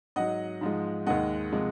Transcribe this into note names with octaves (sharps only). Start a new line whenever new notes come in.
G#2 F#3 D#5 F#5
G#2 F3 G#3
D#2 D#3 G#3 D#5 F#5
C3 F3 G#3